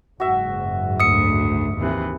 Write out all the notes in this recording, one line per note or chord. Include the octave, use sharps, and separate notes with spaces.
F#1 G#2 F#4 E5
D2 E5 D#6 C#7
D#2 C3 E3